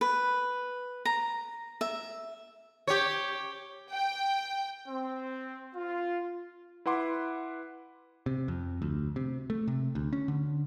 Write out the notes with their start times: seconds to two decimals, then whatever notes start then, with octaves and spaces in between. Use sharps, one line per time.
0.01 B4
1.05 A#5
1.81 E5
2.88 G4 C#5
3.90 G5
4.88 C4
5.76 F4
6.86 E4 B4 F#5 C6 D6
8.26 C3
8.48 F2
8.82 D2
9.16 C3
9.50 A3
9.68 C3
9.95 D2
10.13 C#4
10.28 D3